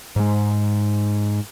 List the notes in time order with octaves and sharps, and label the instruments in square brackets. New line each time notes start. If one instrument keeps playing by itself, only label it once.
[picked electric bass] G#2 G#3